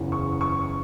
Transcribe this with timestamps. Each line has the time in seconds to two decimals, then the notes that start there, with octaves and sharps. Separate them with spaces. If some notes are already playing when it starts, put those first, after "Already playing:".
Already playing: F#1 E2 C#3 E3
0.12 C#6
0.41 C#6